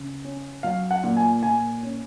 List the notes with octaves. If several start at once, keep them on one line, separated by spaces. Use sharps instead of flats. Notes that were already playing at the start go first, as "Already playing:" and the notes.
Already playing: C#3
C#4
F#3 F5
F#5
A#2
G#5
A#2 G#5
C#4